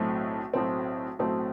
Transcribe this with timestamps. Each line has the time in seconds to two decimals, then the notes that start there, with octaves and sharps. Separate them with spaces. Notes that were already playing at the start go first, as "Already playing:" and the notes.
Already playing: B1 A2 F#3 A3 C4
0.53 B1 A2 F#3 A3 C4
1.19 B1 A2 F#3 A3 C4